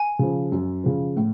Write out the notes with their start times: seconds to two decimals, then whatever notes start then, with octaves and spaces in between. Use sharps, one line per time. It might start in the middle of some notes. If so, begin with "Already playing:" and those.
Already playing: G#5
0.19 C#3 F3
0.52 F#2
0.84 C#3 F3
1.16 A2